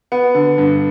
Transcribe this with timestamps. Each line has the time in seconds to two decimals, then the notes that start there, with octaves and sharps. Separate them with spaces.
0.12 B3
0.35 D3
0.58 G2